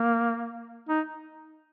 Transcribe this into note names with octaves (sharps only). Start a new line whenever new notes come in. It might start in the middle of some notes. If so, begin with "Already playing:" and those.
Already playing: A#3
D#4